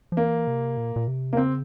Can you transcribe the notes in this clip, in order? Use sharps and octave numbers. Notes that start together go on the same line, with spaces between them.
F3
E3 A#3
C3
A#2
A#2
C3
A#3
C#3 C4